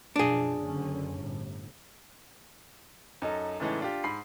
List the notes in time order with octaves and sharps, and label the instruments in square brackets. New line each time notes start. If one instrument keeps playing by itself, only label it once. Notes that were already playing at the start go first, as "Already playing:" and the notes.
[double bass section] F#2 B2 F3 [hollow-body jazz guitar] D4 G#4
[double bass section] F#1 D3 C#4
G1 A2
[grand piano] F#2 D#4 A4
A2 C#3 E3 G#3 D#4 A4
D4 F4 G4
G#2 B5 C7